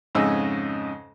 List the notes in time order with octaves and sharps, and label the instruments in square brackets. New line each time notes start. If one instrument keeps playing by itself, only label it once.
[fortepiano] F2 G#2 C#3 C#4 D#5 E6